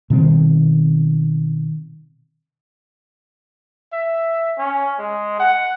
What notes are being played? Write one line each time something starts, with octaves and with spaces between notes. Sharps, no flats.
B2 D#3 G3 C4
E5
C#4
G#3
F#5